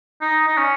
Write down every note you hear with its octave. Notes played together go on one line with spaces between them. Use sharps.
D#4
D#4
C#4